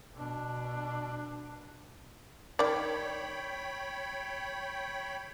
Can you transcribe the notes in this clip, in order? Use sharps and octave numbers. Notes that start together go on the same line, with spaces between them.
B2 D4
D#3 C#5 D5 G5 B5